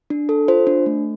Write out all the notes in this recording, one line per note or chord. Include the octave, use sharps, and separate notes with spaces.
D4
A4
F4 C5
D4
A3